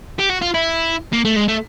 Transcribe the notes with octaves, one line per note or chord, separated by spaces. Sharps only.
G4
F#4
F4
E4
A#3
A3
G#3
A3